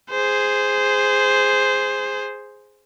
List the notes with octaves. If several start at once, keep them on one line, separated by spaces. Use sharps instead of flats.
G#4 C5